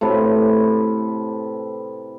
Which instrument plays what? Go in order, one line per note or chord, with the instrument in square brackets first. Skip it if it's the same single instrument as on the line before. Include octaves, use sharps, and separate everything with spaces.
[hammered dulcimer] A2 C3 A4 B4